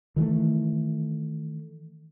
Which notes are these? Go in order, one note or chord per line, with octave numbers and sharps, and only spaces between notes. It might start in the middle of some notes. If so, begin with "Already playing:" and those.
D#3 E3 G3 A3